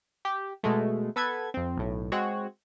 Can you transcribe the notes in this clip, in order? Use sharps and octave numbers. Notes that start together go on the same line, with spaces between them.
G4
B2 G#3 A3
B3 A4 B4 G#6
F2 C4
B1 A2
G#3 C4 F#4 C#5